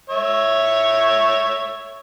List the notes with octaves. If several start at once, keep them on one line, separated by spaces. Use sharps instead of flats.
C#5 E5